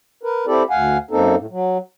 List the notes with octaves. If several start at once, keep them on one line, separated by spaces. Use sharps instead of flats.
A#4 B4
C4 E4 G4 A4 D5
D2 F5 F#5 G#5
F#2 A#3 C4 D#4 A4
A2
F#3